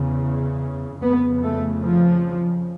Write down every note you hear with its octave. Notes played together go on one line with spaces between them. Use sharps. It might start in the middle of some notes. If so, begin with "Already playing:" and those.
Already playing: E2 C#3
F2 C#3 B3
A3
F3